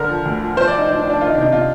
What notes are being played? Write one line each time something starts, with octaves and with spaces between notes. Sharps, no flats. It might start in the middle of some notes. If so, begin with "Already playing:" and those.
Already playing: D3 A#4
F3
D2
F3
F3 C5
D5
F3
D#4
F3 D4
D4
F3
D4
D#3 F4
D#4
C3 D4
D#4
C3 F4